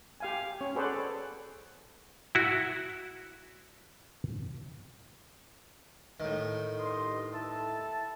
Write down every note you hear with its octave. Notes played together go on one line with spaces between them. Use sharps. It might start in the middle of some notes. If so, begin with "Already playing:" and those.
G4 F5 G#5
C#4 C#5
F#4 G#4 A4 B4 C5 D5
E4 F#4
A2 D#3
G2 D#5 C6
E4 A4 A5